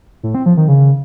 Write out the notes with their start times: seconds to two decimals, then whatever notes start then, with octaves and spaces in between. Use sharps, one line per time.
0.23 A2
0.35 C4
0.46 F3
0.57 D#3
0.68 C#3